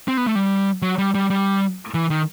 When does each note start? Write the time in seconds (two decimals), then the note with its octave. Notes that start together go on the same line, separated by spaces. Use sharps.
0.08 C4
0.17 B3
0.26 A3
0.35 G3
0.82 F#3
0.98 G3
1.15 G3
1.30 G3
1.94 E3
2.10 D#3